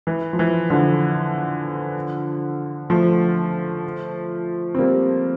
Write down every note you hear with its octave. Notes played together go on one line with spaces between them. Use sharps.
E3
F3
E3
D3 F3
F3 A3
C4
G3 A#3